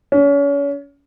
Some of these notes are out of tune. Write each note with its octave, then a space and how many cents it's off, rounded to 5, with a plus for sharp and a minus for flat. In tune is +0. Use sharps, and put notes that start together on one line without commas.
C#4 +35